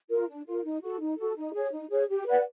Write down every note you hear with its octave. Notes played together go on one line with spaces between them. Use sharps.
F4 A#4
D4
F4 A#4
D#4
F#4 A4
D#4
F#4 A4
D#4
G#4 C#5
D#4
G#4 C#5
G4
B4 D5 F#5